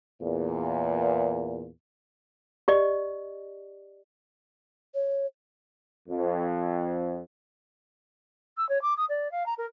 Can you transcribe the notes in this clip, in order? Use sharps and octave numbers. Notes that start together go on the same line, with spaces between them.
E2 A#2
G4 D5 D#5
C#5
F2
E6
C#5
D6
D#6
D5
F5
A#5
A#4